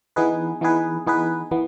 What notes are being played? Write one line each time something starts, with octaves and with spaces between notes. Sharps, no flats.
E3 B3 D#4 G#4 B4
E3 B3 D#4 G#4 B4
E3 B3 D#4 G#4 B4
E3 B3